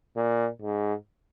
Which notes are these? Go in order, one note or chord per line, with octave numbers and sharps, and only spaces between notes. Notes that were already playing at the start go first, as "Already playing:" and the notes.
A#2
G#2